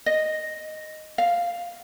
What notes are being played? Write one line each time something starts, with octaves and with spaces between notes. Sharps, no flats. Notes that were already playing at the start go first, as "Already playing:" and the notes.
D#5
F5